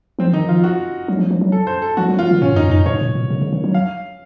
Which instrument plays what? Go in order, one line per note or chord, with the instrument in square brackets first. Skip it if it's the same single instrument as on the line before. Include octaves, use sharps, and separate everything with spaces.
[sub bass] F3 [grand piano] C4
[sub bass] D#3 [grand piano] D#4
[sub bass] F3 [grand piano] F4
[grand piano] F#4
[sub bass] F#3
F3
F3
F#3
[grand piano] A4
C5
A4
[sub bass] F3 [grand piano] F#4
[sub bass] F#3
[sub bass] F3 [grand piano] F4
[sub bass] D#3
[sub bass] A2 [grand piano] C#4
[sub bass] F#2
[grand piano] D#4
[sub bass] F#2
[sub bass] F2 [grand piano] D#4
[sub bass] F#2
[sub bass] A2 [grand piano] C#5
[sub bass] A#2
A#2
C3
C#3
D#3
F#3
[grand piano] F5